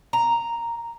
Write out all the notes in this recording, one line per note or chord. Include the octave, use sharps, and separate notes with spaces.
A#5